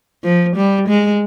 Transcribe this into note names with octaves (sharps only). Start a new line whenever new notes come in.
F3
G3
G#3